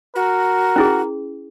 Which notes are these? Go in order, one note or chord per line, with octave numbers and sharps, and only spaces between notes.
F#4 A#4
C#4 E4 G#4